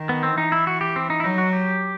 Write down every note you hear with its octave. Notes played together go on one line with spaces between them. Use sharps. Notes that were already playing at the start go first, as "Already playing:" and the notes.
Already playing: D#3
B3
C4
E3 D#4
E4
F#4
G4
C4
D#4
E4
F#3 D#4
F#4
G4